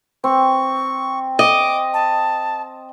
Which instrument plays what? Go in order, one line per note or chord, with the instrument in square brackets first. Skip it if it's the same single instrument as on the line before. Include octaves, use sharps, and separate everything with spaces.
[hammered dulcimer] C4 [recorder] C#6
[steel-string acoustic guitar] D#5 [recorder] D6
[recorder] A5